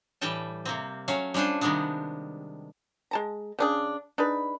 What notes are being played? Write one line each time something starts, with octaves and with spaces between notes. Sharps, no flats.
A2 E3 G3 A4 G5 A5
C3 A#3 C4
F#3 A3 C#4 F5
G3 C#4 D4 F4 C5
C3 D#3 G3 G#3 B3 D4
G#3 A5 A#5
C#3 D4 G#4
D4 D#4 G#4 B4